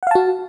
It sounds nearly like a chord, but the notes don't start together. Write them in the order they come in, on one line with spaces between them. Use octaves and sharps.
F#5 F5 A5 F#4